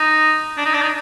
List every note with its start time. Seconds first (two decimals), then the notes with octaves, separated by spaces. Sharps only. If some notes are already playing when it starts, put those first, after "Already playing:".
Already playing: D#4
0.58 D4
0.66 D#4
0.74 D4
0.82 D#4